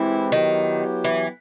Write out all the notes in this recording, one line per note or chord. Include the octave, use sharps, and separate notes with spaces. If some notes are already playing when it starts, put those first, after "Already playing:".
Already playing: E3 G#3 C4 E4 G4 B4
D#3 F#3 B3 E4 G4
E3